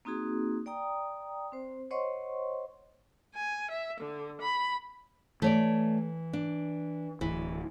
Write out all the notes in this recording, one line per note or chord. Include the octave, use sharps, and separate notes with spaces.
A#3 C4 D#4 F#4 G#4
D5 G5 A#5 D#6
C4 C5
C5 C#5 D#5 F#5 C6 C#6
G#5
E5
D3
B5
E3 A3 C#5 D5
D4
D1 E3